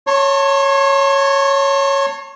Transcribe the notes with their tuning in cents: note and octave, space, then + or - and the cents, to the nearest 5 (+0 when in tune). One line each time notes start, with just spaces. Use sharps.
C#5 +0 A5 +35 C6 +45